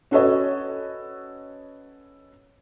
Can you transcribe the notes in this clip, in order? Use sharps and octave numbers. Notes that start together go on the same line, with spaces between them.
C#4 F#4 A4 B4 C#5 D#5